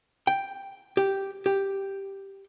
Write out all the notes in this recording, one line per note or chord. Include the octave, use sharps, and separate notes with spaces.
G5
G4
G4